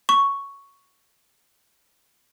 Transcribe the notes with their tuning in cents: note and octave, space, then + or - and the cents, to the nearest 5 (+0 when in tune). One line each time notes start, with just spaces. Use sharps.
C#6 +5